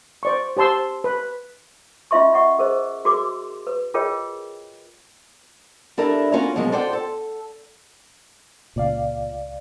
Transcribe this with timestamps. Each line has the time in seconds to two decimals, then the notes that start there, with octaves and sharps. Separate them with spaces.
0.23 C5 D5 C#6
0.57 G4 C5 A5 C6 E6
1.04 B4
2.11 C#4 F4 D#5 E5 C6 C#6
2.33 D#5 E5 F#5 C#6
2.59 G#4 A#4 C5 D#5
3.05 F#4 G#4 A#4 C6 D6
3.67 B4
3.94 F4 G#4 A#4 C#5 D#5 G5
5.98 G3 D4 E4 A4 A#4 E5
6.32 A#3 C#4 F4 F#4 A#4 C#5
6.55 B2 F3 F#3 G#3 A#3
6.72 F4 A4 C5 D5 F#5 G5
6.93 A4
8.76 C#2 A#2 D5 F5